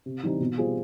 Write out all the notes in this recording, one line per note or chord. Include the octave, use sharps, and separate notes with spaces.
C3
E3 G3 C4 D#4
B2
G3 C4 F4 G#4